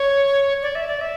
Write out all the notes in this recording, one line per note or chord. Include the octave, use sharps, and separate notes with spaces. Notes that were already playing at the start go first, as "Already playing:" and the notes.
Already playing: C#5
D5
E5
D5
E5